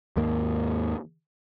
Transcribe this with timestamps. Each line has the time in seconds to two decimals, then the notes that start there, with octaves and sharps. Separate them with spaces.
0.16 D#2 G#2 A#3